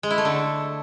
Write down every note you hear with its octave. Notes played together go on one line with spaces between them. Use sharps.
G#3
E4
A3
D3